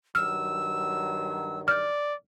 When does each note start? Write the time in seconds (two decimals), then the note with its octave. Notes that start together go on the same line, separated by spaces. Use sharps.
0.15 G2 D#3 F#3 E6 F6
1.68 D5 F6 G6